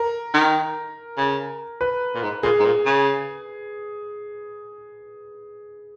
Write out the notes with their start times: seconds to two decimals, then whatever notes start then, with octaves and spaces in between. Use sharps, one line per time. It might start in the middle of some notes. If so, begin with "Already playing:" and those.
Already playing: A#4
0.34 D#3
1.17 C#3
1.81 B4
2.14 A#2
2.23 G#2
2.43 A#2 G#4
2.59 G#2
2.65 A#2
2.86 C#3